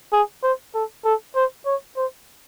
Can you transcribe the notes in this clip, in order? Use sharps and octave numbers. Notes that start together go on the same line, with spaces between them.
G#4
C5
A4
A4
C5
C#5
C5